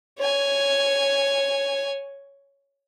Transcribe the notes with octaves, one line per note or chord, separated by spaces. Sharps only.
C#5 G#5